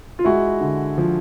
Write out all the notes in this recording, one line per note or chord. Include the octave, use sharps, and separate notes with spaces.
F4
G#3 E4 F#4
D3
F3